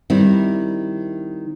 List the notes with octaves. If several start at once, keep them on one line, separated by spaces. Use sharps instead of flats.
D#3 G3 C4 E4